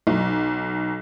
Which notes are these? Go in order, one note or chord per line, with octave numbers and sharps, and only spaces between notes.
B1